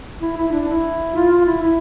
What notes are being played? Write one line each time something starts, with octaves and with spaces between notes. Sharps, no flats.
E4
E4
D4
E4
F4
F4
E4
E4